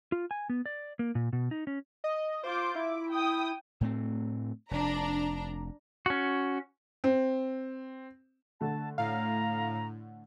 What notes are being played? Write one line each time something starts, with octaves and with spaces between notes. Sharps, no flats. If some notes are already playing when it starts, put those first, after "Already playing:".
F4
G#5
B3
D5
A#3
A#2
B2
D#4
C#4
D#5
F4 C5 D6 G6
E4 D6
G5 D#6
A2 A3 C4
F1 D4 A#5
C#4 F#4
C4
D3 A3 A5
A2 F5 A#5